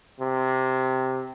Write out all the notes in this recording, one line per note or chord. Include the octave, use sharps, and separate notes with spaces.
C3